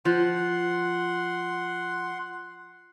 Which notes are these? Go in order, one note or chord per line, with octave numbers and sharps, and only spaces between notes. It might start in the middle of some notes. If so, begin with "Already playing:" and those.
F3 F#5 C6